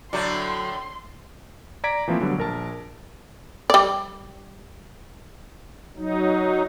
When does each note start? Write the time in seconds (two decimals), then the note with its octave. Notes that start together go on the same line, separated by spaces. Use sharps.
0.13 A2 D3 F#3 A3 A4 D5 C6
1.84 D5 A#5 G#6 B6 D7
2.08 E3 F3 A3 A#3 C4
2.21 D3 F#3 G3 B3
2.38 A#1 A#4 A5
3.70 G3 D5
5.97 F#3 D#4